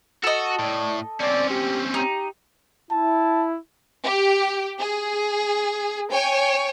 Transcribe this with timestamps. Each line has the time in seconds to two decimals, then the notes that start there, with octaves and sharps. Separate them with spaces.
0.24 F#4 A4 D#5
0.59 A2 D5
1.20 C4 C#4 D5
1.50 G4
1.94 D#4 G4
2.91 E4 A5
4.04 G4
4.78 G#4
6.10 C#5 G5 G#5